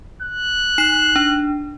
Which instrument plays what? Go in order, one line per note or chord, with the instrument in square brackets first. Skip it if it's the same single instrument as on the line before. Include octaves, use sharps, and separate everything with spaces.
[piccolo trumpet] F#6
[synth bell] D#4 C7 E7
D4